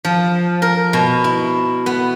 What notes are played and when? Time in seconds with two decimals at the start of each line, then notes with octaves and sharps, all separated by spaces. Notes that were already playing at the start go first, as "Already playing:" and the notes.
0.05 F3
0.62 A#4
0.93 B2
1.24 E4
1.86 B3